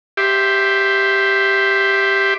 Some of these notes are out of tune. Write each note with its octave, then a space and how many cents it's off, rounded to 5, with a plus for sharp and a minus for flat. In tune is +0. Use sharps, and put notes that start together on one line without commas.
G4 +0 E5 +5 C6 +0